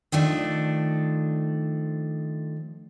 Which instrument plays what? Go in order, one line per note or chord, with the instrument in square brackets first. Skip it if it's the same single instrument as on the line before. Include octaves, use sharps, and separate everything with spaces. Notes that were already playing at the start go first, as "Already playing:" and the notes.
[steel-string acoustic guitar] D#3 F3 A3 D4